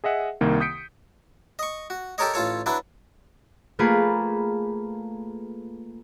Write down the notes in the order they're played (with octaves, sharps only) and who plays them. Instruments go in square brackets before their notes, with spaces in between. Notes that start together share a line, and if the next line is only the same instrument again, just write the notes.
[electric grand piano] G#4 D#5 E5 F#5
C2 D#3 A#3
D#6 G6 B6 C#7 D7
[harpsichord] D#5 C#6
F#4
G4 A4 A#4 C#5 D#5
A1 F4 A4 C#5
F#3 D4 E4 B4
[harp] A3 A#3 F4 G#4 B4